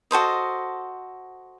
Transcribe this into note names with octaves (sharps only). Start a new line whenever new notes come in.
F#4 A4 C5 D#5